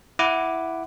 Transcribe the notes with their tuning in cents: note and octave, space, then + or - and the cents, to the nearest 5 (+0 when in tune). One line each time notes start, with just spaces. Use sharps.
E4 +0 F#5 +0 D6 +0